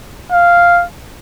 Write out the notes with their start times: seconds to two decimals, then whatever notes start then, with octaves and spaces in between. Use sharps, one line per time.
0.32 F5